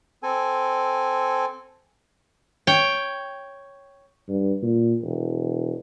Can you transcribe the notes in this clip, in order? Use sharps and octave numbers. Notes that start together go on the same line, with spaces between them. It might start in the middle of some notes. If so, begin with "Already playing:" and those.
C4 A4 G#5
C#5 G5
G2
A#2
E1